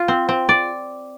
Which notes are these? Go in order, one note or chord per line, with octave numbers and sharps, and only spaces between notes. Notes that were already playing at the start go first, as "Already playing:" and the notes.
Already playing: F4
C4
C4
D5